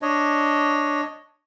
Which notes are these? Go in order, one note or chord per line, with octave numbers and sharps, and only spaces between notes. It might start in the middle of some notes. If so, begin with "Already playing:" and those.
D4 C#5 D#5